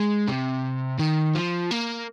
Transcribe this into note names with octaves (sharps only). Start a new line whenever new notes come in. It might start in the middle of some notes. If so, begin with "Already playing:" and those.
Already playing: G#3
C3
D#3
F3
A#3